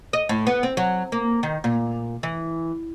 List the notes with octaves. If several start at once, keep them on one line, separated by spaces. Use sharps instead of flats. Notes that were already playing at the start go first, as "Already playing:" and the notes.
D#5
A2
B3
C4
F#3
A#3
D#3
A#2
E3